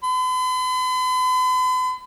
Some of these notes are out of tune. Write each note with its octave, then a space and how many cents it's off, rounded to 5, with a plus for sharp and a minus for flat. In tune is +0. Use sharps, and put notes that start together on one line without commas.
B5 +45